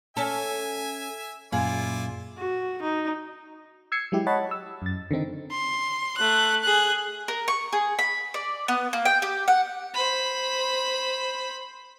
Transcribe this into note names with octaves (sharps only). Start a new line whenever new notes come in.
C#4 A4 E5 G#5
F#2 A#2 E4 F4 G#4 D5 F5
F#4
D#4
E6 G#6 C7 C#7
F#3 G#3 E4 G4
C#5 D#5 F#5 A5 B5 A6
E6
F#2 A6
D3 D#3 C4 D#4
C6
A3 F#6
G#4 F#6
A#4
C#6
G#4
B5
D5
B3
A#3
G5
G4
F#5
C5 B5